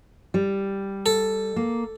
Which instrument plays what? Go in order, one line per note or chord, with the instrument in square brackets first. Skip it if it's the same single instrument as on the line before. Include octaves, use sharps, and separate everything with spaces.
[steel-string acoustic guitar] G3
[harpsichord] A4
[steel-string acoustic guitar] A#3